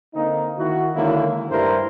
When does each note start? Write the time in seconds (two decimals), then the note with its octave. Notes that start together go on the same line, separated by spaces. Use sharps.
0.14 D3 A#3 C4 D#4
0.58 D#3 E4 F#4
0.96 D3 D#3 G#3 A#3 C#4 E4
1.51 G2 G3 A3 E4 A#4 C5